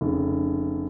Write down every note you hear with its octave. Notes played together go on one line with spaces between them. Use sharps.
F1 C#3